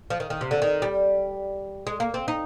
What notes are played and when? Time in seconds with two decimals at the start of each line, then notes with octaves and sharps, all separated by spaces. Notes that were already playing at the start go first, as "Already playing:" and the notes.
0.10 F3
0.20 D#3
0.30 D#3
0.41 C3
0.51 D3
0.62 D#3
0.82 G3
1.87 G#3
2.00 A#3
2.14 C4
2.28 D#4